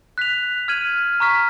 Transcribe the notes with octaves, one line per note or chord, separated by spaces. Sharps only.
F#6 B6 F7
F6 G#6 D#7 F#7
A#5 C#6 F6 B6